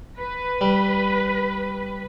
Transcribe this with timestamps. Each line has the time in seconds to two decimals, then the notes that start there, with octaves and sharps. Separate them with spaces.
0.19 B4
0.61 G3